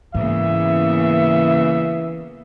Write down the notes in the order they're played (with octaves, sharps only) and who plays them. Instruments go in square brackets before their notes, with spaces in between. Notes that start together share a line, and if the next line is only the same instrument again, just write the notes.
[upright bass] G#2 [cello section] C#3 A#3 B3 [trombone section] E3 [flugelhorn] E5